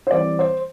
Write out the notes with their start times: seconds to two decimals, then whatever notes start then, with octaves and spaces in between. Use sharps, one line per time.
0.07 C5
0.11 E3 G3 C4 D5
0.39 C5